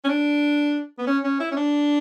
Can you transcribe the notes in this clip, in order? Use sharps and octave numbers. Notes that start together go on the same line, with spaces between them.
C#4
D4
B3
C#4
C#4
E4
C#4
D4